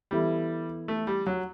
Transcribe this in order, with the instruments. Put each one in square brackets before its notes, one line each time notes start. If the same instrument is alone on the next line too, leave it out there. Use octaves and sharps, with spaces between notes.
[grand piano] E3 B3 E4 A4 [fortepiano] G3
[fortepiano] A3
G3
F#3